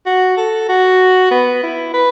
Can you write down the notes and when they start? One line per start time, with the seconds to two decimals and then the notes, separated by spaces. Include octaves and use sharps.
0.06 F#4
0.37 A4
0.69 F#4
1.31 B3
1.63 E4
1.94 B4